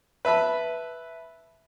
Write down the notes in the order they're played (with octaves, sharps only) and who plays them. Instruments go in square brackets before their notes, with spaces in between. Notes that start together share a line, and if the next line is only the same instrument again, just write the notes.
[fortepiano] B4 E5 A5 B5